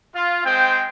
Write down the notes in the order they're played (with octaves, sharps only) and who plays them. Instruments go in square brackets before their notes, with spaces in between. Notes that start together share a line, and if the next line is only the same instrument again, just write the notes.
[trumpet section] F4
G#3 C4 C5 G5